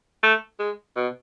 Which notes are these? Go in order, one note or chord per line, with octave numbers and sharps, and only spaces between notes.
A3
G#3
B2